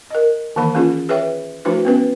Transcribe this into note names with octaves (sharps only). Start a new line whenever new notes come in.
A#4 D#5
D#3 E3 A#3 B5
A#3 C#4 F4 G#4
G#4 B4 C#5 E5 G5
F3 A3 D4 E4 F#4 B4
B3 C#4 B4